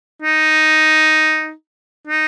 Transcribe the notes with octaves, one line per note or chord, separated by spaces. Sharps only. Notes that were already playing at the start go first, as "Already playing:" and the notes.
D#4
D#4